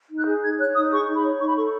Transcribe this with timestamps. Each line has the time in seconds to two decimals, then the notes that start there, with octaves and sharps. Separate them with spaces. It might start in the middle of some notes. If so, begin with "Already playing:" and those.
0.10 D#4
0.19 F#6
0.26 G#4
0.43 D#4 G#6
0.59 C#5 F#6
0.75 D#4 D#6
0.91 G#4 C#6
1.08 D#4
1.16 B5
1.23 C#5
1.40 D#4 C#6
1.48 B5
1.56 A4 C#6